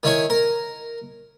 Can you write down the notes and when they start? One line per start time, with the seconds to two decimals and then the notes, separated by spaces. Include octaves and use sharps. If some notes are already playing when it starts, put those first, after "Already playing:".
0.03 D#3 E4 C#5 G#5
0.30 A#4